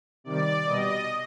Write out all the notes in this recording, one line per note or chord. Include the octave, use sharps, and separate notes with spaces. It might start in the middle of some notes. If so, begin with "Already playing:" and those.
C3 D#3 G3 D5
B2 G3 D#5